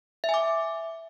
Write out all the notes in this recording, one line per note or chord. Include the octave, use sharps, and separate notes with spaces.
E5
G#5
D6